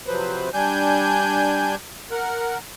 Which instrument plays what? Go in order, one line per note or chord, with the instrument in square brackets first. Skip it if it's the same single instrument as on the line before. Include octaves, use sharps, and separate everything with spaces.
[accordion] C3 F3 F#3 B4 C5
G3 D4 G#5 G6
A#4 F#5